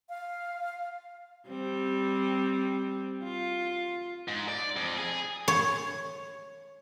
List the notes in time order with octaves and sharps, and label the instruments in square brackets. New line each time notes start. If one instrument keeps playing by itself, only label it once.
[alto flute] F5
[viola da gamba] G3 C4
F4
[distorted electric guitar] G#2
D5
F2
G#4
[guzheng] C#5